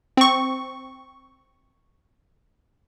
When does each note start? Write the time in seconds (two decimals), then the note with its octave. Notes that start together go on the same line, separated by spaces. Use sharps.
0.17 C4 C#6